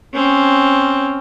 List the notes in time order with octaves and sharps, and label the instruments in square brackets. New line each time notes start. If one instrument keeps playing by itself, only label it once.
[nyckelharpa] C4 C#4